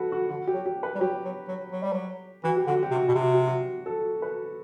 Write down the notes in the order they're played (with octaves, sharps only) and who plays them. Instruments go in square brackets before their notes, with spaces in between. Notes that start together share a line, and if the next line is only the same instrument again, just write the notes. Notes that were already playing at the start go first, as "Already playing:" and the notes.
Already playing: [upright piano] F#4 A4 B4 F#5
F#4
[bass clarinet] D3 [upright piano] F#4
[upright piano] G4
[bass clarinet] F#3
[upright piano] G4
B4
[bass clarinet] G3
[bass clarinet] F#3 [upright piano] G4
[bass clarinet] F#3
F#3
F#3
G3
F#3
[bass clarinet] E3 [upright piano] F#4
[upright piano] G4
[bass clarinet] D3
[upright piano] F#4
G4
[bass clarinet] C3
[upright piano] F#4
[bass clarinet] B2 [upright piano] G4
[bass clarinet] C3
[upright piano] F#4
G4
F#4
A4
B4